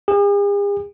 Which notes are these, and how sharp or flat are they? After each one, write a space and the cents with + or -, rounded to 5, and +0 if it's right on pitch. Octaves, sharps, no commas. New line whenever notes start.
G#4 -45